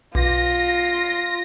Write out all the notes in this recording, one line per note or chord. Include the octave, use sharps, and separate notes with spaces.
B1 F4 A#6